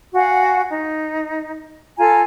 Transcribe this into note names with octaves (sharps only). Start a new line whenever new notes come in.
F#4 F5 F#5 G#5
D#4
F4 A4 G#5 A#5